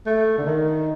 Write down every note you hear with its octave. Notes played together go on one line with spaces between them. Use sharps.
A3
D3
D#3